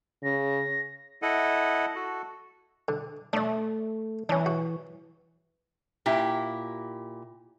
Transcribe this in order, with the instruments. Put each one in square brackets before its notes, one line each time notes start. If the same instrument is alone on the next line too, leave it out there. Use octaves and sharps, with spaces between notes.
[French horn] C#3 [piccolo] A#6
[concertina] E4 A4 D#5 F#5
F#4 A4
[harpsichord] D3
[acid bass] A3 [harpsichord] D4 D5
[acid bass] E3 [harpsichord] C#4 D4
[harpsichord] F#4
[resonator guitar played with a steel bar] A#2 E4 G4